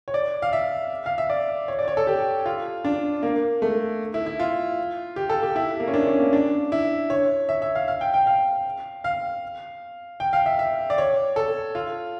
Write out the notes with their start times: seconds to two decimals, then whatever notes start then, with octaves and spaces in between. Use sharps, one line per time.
0.08 C#5
0.14 D5
0.42 F5
0.53 E5
1.06 F5
1.18 E5
1.30 D5
1.68 C#5
1.79 D5
1.88 C#5
1.97 A4
2.07 G4
2.46 F4
2.85 D4
3.23 A#3
3.62 A3
4.14 E4
4.26 E4
4.40 F4
5.16 G4
5.30 A4
5.43 G4
5.56 E4
5.80 A#3
5.87 C#4
5.94 D4
6.07 C#4
6.20 A#3
6.33 D4
6.72 E4
7.10 C#5
7.49 E5
7.62 E5
7.75 F5
7.88 F5
8.01 G5
8.14 G5
8.27 F5
9.04 F5
10.20 G5
10.33 F5
10.46 E5
10.59 E5
10.90 D5
10.98 C#5
11.36 A4
11.75 F4